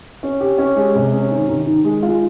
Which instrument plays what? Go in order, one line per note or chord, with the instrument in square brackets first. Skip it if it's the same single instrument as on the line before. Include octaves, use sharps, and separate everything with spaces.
[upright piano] C#4
G4
C#4
G#3
C3
C#4
D#3
D#3
D#3
G#3
F4